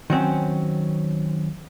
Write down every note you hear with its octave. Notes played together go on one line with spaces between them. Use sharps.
D#3 F#3 C4 C#4